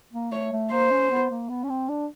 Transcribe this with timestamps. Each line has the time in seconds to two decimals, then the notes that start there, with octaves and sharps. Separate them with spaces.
0.13 A#3
0.31 A3 C#5
0.52 A3
0.72 A#3 C5
0.91 C#4
1.11 B3
1.30 A#3
1.49 B3
1.63 C#4
1.69 C4
1.89 D4